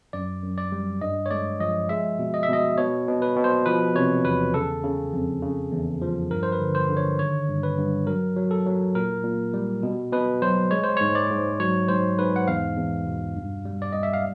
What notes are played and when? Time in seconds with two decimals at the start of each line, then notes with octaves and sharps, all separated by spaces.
0.13 F#2 D5
0.43 F#2
0.58 D5
0.72 G3
1.01 G2 D#5
1.26 C#5
1.31 G#3 D5
1.60 F3 D#5
1.89 G#3 E5
2.19 B2
2.34 D#5
2.43 E5
2.49 B2 D#5
2.78 B2 C#5
3.08 B2
3.22 B4
3.36 B2
3.44 C5
3.66 F3 B4
3.95 C3 C#5
4.25 E2 B4
4.54 C#3 A4
4.84 C#3
5.13 F2
5.42 C#3
5.72 E2
6.02 F3
6.30 G2 A#4
6.43 C5
6.52 B4
6.60 D3
6.75 C5
6.90 D3
6.97 C#5
7.18 D#3 C#5
7.48 G2
7.63 B4
7.78 G2
8.07 F#3 A#4
8.36 F#3
8.51 A4
8.66 F#3
8.95 A#2 A#4
9.24 A#2
9.54 G3
9.83 B2
10.12 B2 B4
10.42 F#3 C5
10.71 G#3 C#5
10.84 C5
10.97 G#2 C#5
11.15 D5
11.30 G#2
11.60 F#3 C#5
11.88 G#2 C5
12.18 G#2 B4
12.36 F#5
12.48 E2 F5
12.77 E2
13.06 B2
13.36 G2
13.65 G3
13.82 D5
13.92 G3 D#5
14.03 E5
14.13 F5